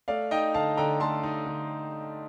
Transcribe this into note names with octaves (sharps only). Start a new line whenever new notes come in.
A3 D5 F5
D#4 D#5 G5
D3 F5 A5
D3 G5 A#5
A3 A5 C6
D#4
D3